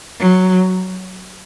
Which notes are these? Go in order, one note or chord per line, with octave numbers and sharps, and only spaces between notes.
F#3